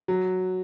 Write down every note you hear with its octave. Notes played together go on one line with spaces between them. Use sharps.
F#3